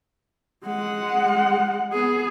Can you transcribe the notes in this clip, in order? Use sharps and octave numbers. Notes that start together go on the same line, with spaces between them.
G#3 F#5
B3 G#4